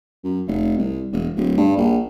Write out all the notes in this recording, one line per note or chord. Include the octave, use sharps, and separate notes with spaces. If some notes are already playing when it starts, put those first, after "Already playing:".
F#2
F1
C2
E1
D1
G2
A#1